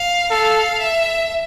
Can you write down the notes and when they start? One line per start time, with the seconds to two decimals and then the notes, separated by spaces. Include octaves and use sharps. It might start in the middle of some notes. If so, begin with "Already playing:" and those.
Already playing: F5
0.30 A4 F5
0.79 E5